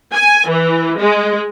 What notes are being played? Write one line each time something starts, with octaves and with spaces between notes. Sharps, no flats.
G#5
E3
G#3